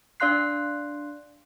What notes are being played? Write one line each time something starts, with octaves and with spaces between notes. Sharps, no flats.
D4 D5 F5 C6 F#6 C7